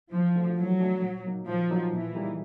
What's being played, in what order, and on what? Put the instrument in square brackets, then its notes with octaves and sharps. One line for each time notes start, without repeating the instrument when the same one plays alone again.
[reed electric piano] E3 [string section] F3
[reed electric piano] A3 D4 F#4 A4
[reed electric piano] E3 [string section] F#3
[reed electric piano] A3 D4 F#4 A4
A#2
F#3 A#3 D#4
[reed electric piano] A#2 [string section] F3
[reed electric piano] F#3 A#3 D#4
[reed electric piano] A#2 [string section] E3
[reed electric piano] G3 A#3 D#4 G#4